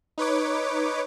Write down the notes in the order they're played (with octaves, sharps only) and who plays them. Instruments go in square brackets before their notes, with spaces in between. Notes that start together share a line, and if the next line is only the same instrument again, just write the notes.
[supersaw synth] D#4 B4 C#5 D6